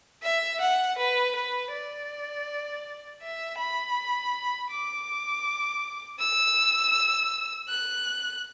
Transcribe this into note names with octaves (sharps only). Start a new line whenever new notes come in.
E5
F#5
B4
B4
D5
E5
B5
D6
E6
F#6